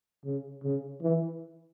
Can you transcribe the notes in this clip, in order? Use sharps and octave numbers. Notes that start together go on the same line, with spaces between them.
C#3
C#3
E3